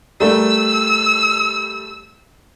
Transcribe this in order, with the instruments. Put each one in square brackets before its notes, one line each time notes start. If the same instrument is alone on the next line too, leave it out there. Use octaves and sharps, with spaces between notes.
[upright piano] G3 A3 A#4 [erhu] E6